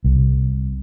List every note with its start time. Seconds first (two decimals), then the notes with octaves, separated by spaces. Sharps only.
0.04 C2